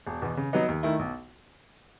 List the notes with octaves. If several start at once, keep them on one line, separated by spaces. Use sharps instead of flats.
E1
E2 B2
C#3
F#3 B3 D#4
D#2
D#3 A3 E4
B1